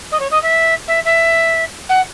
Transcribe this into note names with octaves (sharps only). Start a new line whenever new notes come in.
D#5
C#5
D#5
E5
E5
E5
F#5